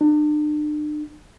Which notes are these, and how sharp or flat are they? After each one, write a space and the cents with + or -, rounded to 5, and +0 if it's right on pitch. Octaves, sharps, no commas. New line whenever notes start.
D4 +40